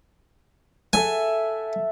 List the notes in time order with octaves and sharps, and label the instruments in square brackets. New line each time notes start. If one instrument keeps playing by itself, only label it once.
[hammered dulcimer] A4 E5 F#5 [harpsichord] G#5